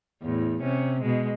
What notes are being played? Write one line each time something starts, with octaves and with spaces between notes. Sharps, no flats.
E2 A2
C3 C#4
B2 G#3